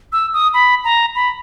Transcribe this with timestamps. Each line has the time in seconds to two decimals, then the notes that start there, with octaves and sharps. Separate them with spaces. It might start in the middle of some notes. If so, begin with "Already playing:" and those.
0.12 E6
0.34 D#6
0.54 B5
0.84 A#5
1.15 B5